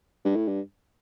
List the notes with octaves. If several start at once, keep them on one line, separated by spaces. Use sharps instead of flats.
G2
A2
G2